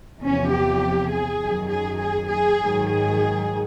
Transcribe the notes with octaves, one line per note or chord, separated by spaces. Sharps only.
E2 C3 F3 C#4
G4
G#4
F#2 D#3 F#3
G#4
G#4
G#4
G#2 D#3 F#3
G#4